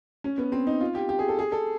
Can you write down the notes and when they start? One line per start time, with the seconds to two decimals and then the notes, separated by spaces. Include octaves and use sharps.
0.24 C#4
0.38 B3
0.52 C4
0.67 D#4
0.81 F4
0.95 G4
1.09 G4
1.19 G#4
1.28 A4
1.39 G#4
1.52 A4